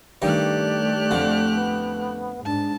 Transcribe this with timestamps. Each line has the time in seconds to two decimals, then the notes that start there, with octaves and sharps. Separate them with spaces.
0.22 G2 D#3 A3 G4 D5 F#6
1.11 F2 D3
1.53 B3
2.45 G#2 D4 A5